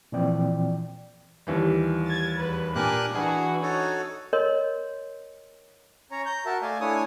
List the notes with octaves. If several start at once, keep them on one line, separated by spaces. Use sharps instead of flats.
A#2 E3 F3 C4 D5 G5
D#2 E3 G3
G#6 A6
E2 B4
A#2 A#3 D4 G4 A#4 G#5 F#6
E3 D4 F#4 G#4 G#5
D#4 F#4 A4 C#5
A#4 C#5 D#5 C6
C#4 C#5 A#5
A#5 G6
F#4 A#4 E5 A5
A3 D5 F5 G#5
A3 D4 E4 C#5 G#5 D#6